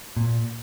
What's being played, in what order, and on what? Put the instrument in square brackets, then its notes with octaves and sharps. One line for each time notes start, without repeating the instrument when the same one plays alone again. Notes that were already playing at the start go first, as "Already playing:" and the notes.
[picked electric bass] A#2